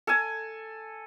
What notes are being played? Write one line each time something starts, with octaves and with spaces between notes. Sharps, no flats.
A4 G#5